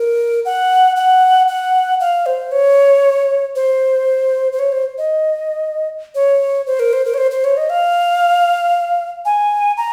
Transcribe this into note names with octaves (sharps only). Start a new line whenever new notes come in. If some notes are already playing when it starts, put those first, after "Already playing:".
Already playing: A#4
F#5
F#5
F#5
F5
C5
C#5
C5
C5
C#5
C5
D#5
C#5
C5
A#4
C5
A#4
C#5
C5
C5
C#5
D#5
F5
G#5
A#5